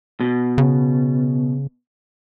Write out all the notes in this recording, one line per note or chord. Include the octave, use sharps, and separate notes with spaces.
B2
C#3